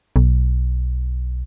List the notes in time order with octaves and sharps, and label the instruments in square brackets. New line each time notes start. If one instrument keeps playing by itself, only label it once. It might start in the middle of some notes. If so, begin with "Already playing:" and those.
[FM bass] B1